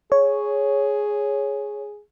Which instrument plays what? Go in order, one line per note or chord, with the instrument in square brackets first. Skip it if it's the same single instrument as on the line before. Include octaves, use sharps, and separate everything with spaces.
[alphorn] G#4 [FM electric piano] C#5